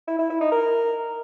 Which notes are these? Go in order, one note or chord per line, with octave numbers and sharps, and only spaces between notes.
E4
E4
E4
D#4
A#4